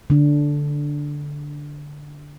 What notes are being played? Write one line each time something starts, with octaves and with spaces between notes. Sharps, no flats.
D3 D4